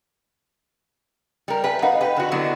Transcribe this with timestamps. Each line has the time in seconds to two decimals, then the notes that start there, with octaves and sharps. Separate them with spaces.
1.48 G3 A#4
1.64 G4 B4 E5 G#5
1.82 D#4 B4 F5 F#5
2.01 G4 B4
2.16 D3 F#4
2.31 D3 F#3 B3 E4 G4 D#5